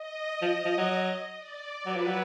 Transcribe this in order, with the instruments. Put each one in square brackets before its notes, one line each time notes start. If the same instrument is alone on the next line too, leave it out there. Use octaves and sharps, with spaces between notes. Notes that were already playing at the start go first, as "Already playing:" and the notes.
Already playing: [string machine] D#5
[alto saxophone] F3
F3
F#3
[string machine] D5
[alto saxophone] F#3 [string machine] B4
[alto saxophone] F3
F#3